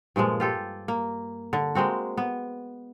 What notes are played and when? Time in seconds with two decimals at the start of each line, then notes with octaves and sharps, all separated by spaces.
0.16 G2 A#2 F3 G#3
0.40 F4 G4 A4
0.88 A#3
1.53 D3
1.75 G#3 A#3 C4 F#4
2.17 B3